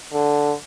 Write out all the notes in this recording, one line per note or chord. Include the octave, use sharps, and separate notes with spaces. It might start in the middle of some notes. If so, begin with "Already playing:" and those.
D3